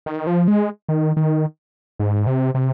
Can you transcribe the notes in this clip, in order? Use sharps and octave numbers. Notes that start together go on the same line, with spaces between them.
D#3
F3
G#3
D#3
D#3
G#2
C3
C3